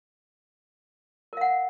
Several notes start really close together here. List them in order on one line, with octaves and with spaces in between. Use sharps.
A#4 F5 F#5